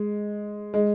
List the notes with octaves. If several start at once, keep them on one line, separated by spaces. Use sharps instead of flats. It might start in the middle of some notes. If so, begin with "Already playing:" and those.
Already playing: G#3
G#3